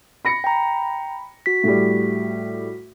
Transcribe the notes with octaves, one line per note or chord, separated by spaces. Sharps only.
B5 A#6 C#7
G5 A#5
F#4 B6
A2 G3